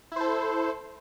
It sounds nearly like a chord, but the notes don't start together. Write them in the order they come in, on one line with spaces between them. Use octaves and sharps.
E4 C5 A4